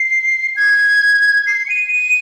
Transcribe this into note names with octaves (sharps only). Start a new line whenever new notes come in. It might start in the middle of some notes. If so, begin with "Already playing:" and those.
Already playing: C7
G#6
C7
C#7
D#7
D#7